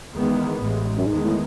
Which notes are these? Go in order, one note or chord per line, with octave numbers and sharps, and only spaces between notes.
E2 D#3 G#3 B3
A1 A2 G#3
F#2
E2 G#2 D#3 G#3
A2